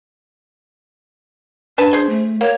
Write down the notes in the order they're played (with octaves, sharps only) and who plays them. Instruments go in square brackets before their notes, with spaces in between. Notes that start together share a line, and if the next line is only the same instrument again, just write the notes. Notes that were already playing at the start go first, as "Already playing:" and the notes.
[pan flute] D4 [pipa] B4 A5
[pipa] G#4 C5
[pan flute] A3
[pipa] A#3 [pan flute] C#5